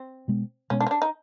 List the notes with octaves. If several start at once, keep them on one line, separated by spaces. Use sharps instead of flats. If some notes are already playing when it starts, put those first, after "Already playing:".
Already playing: C4
B2 G#3 B3
B2 G#3 B3 C#4
D4
C#4
D4
D#4